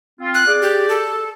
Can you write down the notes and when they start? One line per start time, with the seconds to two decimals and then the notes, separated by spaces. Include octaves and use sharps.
0.20 C4 F4
0.34 F#6
0.46 G#4 D5
0.62 G4
0.89 A4